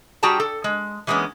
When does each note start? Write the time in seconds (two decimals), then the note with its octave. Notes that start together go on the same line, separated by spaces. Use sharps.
0.23 G3 F#4 G#4 G5 A5 A#5
0.40 A4
0.64 G#3
1.07 E3 G3 G#3 A#3 B3 C#4